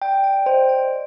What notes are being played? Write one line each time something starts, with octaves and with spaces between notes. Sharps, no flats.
D5 G5
D5
C5 D#5
D5